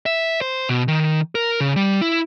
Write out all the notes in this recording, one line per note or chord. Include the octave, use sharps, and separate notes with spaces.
E5
C5
B2
D#3
A#4
C#3
G3
E4